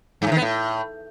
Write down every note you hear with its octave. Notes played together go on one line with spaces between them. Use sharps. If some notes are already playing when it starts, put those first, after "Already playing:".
G2
A2
D#3
B3
A2